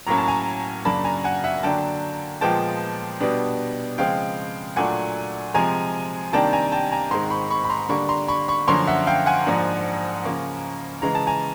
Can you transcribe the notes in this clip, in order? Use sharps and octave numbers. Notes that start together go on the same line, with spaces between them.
A2 F#3 A#3 C#4 A#5
A5
G#5 A#5
F#2 C#3 F#3 A#3 D4 A5 B5
G#5 A#5
F#5 G#5
E5 F#5
D3 F#3 A#3 D4 G5 A5
A#2 F3 G#3 B3 G5 A5
B2 G3 B3 D4
C#3 F3 G#3 C4 F5 G5
A#2 F#3 A3 D4 F#5 G#5
C3 F3 G#3 G#5 A#5
C3 D#3 G3 A#3 D4 G5 A5
G#5 A#5
G5 A5
G#5 A#5
G#2 D#3 G#3 C4 A#5 C6
B5 C#6
B5 C#6
B5
A#5 C6
D3 G3 A#3 D4 B5 C#6
A#5 C6
B5 C#6
B5 C#6
F#2 D3 F3 A#3 C#4 A#5 C6
E5 F#5
F5 G5
F#5 G#5
G#2 F3 A#3 D4
C#3 F3 A#3 C#4
C#3 E3 G#3 A#5
A5
G#5 A#5